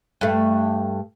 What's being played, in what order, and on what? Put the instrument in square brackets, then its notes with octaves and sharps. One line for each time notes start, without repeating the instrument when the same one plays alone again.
[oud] G2 A3